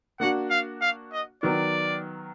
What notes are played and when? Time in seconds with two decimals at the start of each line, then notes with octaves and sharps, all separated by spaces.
0.20 A#3 D4 F#4 F#5
0.50 F5
0.81 F5
1.12 D#5
1.43 D#3 F#3 B3 D5